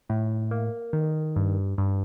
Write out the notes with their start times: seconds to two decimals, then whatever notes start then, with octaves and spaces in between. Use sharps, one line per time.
0.09 A2
0.51 A#3
0.93 D#3
1.36 G2
1.78 G2